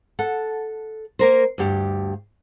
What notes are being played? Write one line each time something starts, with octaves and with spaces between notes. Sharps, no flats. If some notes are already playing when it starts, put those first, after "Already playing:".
A4 F#5
A#3 A#4 C5
D2 G2 G4